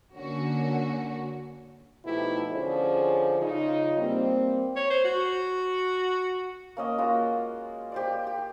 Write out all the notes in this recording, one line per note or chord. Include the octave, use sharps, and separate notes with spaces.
D3 A#3 C#4 F#4
B2 F3 A3 D#4 E4 G4
D3 F3 C#4 G#4 C5 D5
C#3 D#4 F4
G3 A#3 C4
C#5
C5
F#4
A#3 C#4 D#5
G#3 A#3 F4 F#4
G4 C5 D5
G4